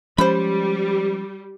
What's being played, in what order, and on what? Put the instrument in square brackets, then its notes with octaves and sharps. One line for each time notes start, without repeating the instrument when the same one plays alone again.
[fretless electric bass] F3 G#3 C#4 [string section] G3 [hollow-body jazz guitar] C5 B5